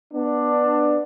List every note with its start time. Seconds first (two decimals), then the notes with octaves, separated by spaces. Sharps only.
0.14 B3 D4